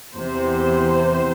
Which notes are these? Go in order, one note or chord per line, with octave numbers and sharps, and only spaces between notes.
E2 C3 E3 C5